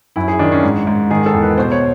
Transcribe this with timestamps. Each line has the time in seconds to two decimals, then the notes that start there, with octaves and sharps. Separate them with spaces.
0.16 F#2 E4
0.28 G#4
0.39 D#3 D4
0.52 C#4
0.63 G#2
0.87 G#2
1.11 D#3 G#4
1.26 A4
1.34 E2
1.42 B4
1.58 B2 C5
1.72 C#5